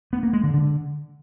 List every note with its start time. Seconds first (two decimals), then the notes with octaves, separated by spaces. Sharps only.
0.13 B3
0.23 A#3
0.33 G#3
0.44 D3
0.54 D3